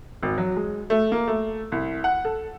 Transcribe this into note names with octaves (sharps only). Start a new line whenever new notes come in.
G#1
F#3
G#3
A3
A#3
A3
C2
F#5
A4